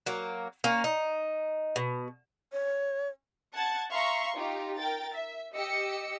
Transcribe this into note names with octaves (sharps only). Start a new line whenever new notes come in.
F#3 A#3
A#3 C#4
D#4
B2
C#5
F#5 A5 G#6 A6
E5 F5 A#5 C6 C#6
D#4 F4 G4
A#4 G5 A6
E5
G4 D#5 E6 C#7